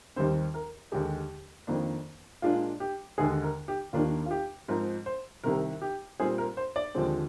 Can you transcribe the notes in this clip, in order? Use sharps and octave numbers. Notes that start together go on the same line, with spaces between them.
D#2 D#3 G3 C4 C5
A#4
D#2 D3 G#3 G4
F2 D#3 A#3 D4
A#2 G#3 D4 F4
G4
D#2 D3 G#3 G#4
A#4
G4
D#2 D#3 A#3 D4 F4
F4
G4
G#2 F3 C4 A#4
C5
C2 C3 D#3 A#4
G4
A#2 G3 C4 G#4
A#4
C5
D5
D#2 D3 F3 G#3 C4